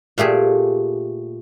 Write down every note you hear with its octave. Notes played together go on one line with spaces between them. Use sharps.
A#2 A3 G4 G#4